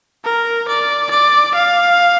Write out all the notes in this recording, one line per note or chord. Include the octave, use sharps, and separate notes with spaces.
A#4
D5
D5
F5